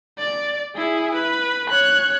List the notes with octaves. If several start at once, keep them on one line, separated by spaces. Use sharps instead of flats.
D5
E4 G#4
B4
C#5 F#6